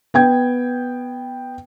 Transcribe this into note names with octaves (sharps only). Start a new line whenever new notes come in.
B3 G5 G#6